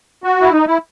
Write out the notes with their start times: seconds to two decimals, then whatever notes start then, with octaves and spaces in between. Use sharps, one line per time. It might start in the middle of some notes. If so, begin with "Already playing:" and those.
0.24 F#4
0.41 E4
0.52 D#4
0.67 E4